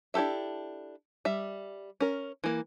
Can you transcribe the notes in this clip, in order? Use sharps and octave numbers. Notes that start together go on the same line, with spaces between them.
D4 E4 G4 A4 E5
G3 E5
C#4 A#4
E3 A#3